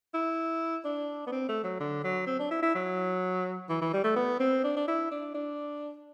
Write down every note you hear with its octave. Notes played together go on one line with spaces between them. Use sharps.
E4
D4
B3
C4
A3
F#3
D3
F#3
C4
D4
E4
E4
F#3
E3
E3
G3
A3
B3
C4
D4
D4
E4
D4
D4